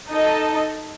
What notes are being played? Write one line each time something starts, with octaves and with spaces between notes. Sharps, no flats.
D#4 A4 D#5 A5